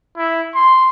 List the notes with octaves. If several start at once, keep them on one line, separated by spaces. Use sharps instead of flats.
E4
C6